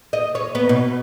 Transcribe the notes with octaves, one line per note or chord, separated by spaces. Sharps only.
D#5
C#5
B3
B2